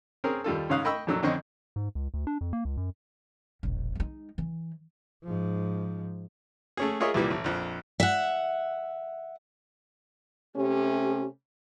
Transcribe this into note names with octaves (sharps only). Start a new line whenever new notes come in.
C4 C#4 G#4 A#4
D#2 G3 F4 A4
G#2 C#3 C#4 F5 D#6 F#6
D#5 G5 B5 C#6 E6
F2 A#2 F#3 A4 E6
F2 D3 C4 C#4 D#5 C#6
G#2
C#2
D2
D4
F2
A#3
C#2
F#2
E1 A#1
G#3 D#4
E3
G#2 F3
A3 C#4 G#4
F4 G#4 A#4 C#5 D#5 E5
C2 A#2 E3 G3
A1
A#1 F2
E5 F#5
C3 A3 C#4 G4